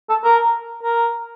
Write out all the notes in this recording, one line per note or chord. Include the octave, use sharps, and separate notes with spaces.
A4
A#4
A#4